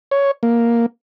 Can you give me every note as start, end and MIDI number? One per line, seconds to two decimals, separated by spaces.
0.11 0.31 73
0.43 0.86 58